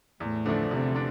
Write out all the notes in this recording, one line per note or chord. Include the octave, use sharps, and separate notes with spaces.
E2 A2
D3 F3 A3 D4
E2 C3
D4